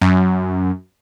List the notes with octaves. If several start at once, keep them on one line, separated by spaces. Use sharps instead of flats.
F#2